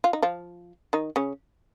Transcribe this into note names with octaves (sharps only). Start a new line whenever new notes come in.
F4
D#4
F3 F4
D#3 D#4
C#3 C#4